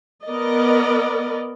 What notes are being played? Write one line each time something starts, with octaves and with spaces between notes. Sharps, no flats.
B3 A#4 D5 D#5